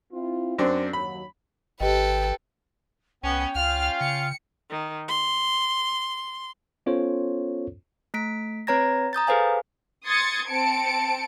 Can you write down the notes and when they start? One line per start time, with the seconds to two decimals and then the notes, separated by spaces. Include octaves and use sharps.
0.12 C4 E4 F4
0.59 F#2 C4 D4 C5
0.93 D#2 F#3 B5
1.81 G#1 G4 A4 B4 D#5 G5
3.23 C2 B3 C#4 G5
3.55 C#2 C#4 F4 F5 F6
4.01 C#3 C#7
4.71 D#3
5.08 C6
6.86 B3 C#4 F4 A4 C5 C#5
8.14 A3 B6 D7
8.67 C4 B4 C#5 A#5 G#6 A#6
9.13 A#5 D#6 G6 A6
9.27 G#4 A4 B4 C5 F5 G#5
10.07 C6 D#6 G#6 A6 C#7
10.49 C4 A5 C#7 D7